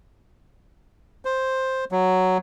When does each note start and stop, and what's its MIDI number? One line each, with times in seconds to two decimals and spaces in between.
1.25 1.85 72
1.92 2.38 54